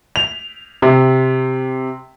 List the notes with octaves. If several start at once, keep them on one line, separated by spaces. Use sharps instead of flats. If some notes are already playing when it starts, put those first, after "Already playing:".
F7
C3